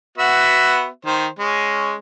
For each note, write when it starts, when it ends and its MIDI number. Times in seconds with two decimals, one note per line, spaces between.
0.18 0.87 59
0.18 0.87 66
0.18 0.87 76
1.05 1.27 51
1.05 1.27 72
1.39 1.95 56
1.39 1.95 61